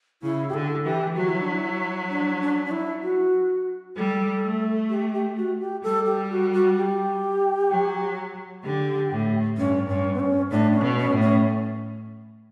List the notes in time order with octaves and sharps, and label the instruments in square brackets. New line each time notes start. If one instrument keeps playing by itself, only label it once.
[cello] C#3 [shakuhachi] E4
[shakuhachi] G4
[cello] D3 [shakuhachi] A4
[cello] E3 [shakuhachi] G4
[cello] F#3 [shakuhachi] F#4
[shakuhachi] E4
D4
E4
D4
D4
D4
E4
F#4
[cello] G3 [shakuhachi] A4
[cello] A3
[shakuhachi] G4
G4
F#4
G4
[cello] G3 [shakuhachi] A4
[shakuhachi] G4
F#4
F#4
G4
[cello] F#3
[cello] D3 [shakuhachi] G4
[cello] A2
[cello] G2 [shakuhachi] C#4
[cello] G2 [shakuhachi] C#4
[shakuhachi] B3
C#4
[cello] A2 [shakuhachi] D4
[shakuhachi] C#4
[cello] B2
[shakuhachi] C#4
[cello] A2
[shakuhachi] C#4